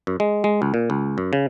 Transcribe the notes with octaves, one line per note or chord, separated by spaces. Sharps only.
F#2
G#3
G#3
C#2
A#2
C#2
F#2
C#3